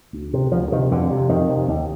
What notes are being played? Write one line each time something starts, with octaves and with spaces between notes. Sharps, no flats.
D2
C3
D2 F3
C3 D#3
F2 D3
C3
F2 D#3
C3
D#2